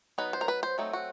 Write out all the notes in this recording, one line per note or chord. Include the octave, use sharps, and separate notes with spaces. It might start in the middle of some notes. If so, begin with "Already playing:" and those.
F#3 B3 D#4 B4
C5
A#4
B4
C5
F#3 A3 C4 D#4
F#4